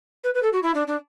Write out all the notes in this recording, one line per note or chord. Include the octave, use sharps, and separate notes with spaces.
B4
B4
A4
F#4
E4
D4
D4